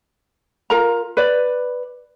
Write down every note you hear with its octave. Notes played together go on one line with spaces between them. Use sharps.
F4 A#4 A#5
B4 D5